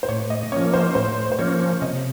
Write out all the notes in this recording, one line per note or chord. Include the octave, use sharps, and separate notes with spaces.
C5
A2 C#5
D#5
F3 A#3 C#4 C#5
C5
A2 C5
C5
F3 A#3 C#4 C#5
C3 D#5